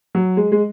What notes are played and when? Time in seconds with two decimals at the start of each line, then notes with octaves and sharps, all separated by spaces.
0.15 F#3
0.37 G#3
0.52 G#3